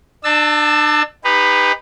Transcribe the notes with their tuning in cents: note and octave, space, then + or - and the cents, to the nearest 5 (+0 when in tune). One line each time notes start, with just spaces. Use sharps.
D4 +35 A5 +0 E6 +0
D#4 +0 G4 +30 B4 +5